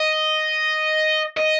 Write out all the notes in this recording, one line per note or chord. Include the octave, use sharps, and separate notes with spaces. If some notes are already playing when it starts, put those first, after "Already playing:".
Already playing: D#5
D#5